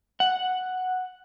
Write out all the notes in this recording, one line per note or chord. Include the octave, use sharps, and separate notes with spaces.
F#5